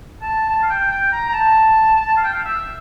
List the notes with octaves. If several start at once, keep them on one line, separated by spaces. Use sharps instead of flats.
A5
A5
F5
G5
G5
A#5
A#5
A5
F5
G5
F5
E5